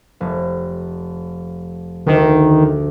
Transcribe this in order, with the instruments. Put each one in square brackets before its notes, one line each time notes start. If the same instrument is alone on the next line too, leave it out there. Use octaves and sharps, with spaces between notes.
[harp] F1
[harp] D2 [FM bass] D#3